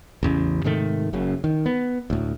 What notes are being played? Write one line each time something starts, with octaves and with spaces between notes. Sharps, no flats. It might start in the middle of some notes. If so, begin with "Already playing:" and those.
A1 E2 C#3
G#2 C3 D#3 A3
F#1 F#2 C#3
D#3
B3
D2 A2